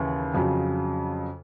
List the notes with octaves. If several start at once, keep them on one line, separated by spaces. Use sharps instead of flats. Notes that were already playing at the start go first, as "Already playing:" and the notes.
Already playing: D#2 C#3 E3
F2 C#3 F#3